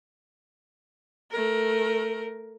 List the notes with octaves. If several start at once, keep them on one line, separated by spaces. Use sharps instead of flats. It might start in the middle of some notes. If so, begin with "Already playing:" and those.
A3 A#4